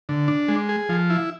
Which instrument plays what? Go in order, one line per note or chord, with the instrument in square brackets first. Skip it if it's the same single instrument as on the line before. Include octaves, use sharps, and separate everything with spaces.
[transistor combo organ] D3
D4
G#3
G#4
F3
E4